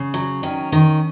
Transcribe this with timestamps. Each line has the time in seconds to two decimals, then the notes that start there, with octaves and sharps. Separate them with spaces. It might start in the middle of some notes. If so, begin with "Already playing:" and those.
Already playing: C#3
0.14 F#3
0.43 D#3 C#4
0.72 D#3